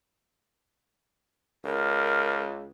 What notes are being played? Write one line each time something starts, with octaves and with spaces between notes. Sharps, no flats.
C#2 A#4